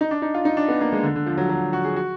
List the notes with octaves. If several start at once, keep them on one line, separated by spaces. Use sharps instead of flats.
D#4
D4
D#4
F4
D#4
D4
B3
A#3
G#3
D3
D3
F3
F#3
F#3
F#4
G#4
F#4